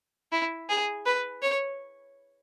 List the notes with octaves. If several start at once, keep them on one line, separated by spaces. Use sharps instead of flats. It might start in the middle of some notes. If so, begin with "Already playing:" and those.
E4
G#4
B4
C#5